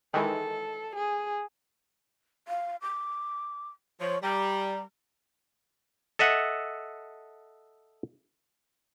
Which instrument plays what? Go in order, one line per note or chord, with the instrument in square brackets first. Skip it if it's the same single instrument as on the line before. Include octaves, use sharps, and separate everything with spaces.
[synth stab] D#3 E3 G#3 [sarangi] A4
[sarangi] G#4
[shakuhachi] F5
D6
[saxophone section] F3 [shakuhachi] C#5
[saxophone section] G3 [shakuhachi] A#5
[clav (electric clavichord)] A4 D#5 E5 F#5